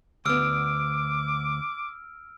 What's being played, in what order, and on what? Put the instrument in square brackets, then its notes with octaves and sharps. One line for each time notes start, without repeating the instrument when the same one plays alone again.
[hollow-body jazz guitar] D2 B3 [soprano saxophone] D6 [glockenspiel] E6 F6 D7